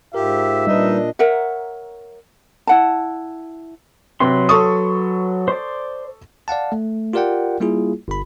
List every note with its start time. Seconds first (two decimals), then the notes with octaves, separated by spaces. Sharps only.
0.15 G#2 F4 G4 A#4 E5
0.67 A#2 G3 D4 D#4 B4 D#5
1.19 A#4 C#5 E5 F#5
2.67 E4 F#5 A5
4.20 C3 F#3 B4 C6
4.49 A4 C#6 D#6
5.48 C5 D5
6.48 D5 F5 F#5 A5
6.72 A3
7.13 F4 G4 A#4 D5 F#5 G5
7.60 G3 A#3 E4 F4 G#4
8.08 G1 B5